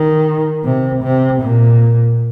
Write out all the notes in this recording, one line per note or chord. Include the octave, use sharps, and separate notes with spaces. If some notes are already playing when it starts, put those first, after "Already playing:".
Already playing: D#3
C3
C3
A#2